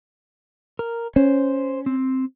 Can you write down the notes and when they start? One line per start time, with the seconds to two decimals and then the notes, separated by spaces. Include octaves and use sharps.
0.79 A#4
1.16 C#4 C5
1.86 C4